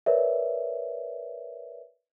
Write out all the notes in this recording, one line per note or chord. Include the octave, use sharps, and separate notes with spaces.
A#4 B4 C#5 D5 E5